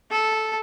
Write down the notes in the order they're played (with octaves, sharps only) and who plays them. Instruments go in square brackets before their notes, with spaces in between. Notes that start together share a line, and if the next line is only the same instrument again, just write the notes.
[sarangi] A4